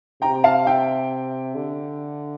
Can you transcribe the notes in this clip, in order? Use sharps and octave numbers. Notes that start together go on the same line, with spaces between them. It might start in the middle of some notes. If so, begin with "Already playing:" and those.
C3 G5 A#5
F5 A5
E5 G5
D3